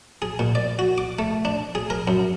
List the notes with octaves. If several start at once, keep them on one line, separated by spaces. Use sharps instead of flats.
G#4
A#2
D5
F#4
D6
A3
D4
G#4
A#4
F#2